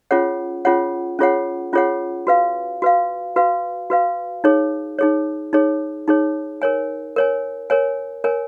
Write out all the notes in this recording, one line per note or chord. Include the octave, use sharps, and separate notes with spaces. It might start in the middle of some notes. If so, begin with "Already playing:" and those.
C#4 F4 G#4 C#5 F#5
C#4 F4 G#4 C#5 F#5
C#4 F4 G#4 C#5 F#5
C#4 F4 G#4 C#5 F#5
F#4 B4 F5
F#4 B4 F5
F#4 B4 F5
F#4 B4 F5
D#4 G#4 C#5
D#4 G#4 C#5
D#4 G#4 C#5
D#4 G#4 C#5
A#4 C#5 G#5
A#4 C#5 G#5
A#4 C#5 G#5
A#4 C#5 G#5